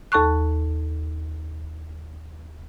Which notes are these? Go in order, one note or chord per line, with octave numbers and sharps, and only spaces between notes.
D#2 A4 A5 C#6 F#6